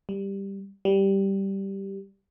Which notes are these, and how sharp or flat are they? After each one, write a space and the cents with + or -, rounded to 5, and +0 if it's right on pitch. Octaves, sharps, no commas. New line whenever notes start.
G3 +5
G3 -5